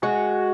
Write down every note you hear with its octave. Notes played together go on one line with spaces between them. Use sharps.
G#3 F#4